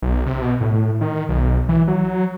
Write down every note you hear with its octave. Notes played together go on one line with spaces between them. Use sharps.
B1
C3
B2
A2
D#3
B1
E3
F#3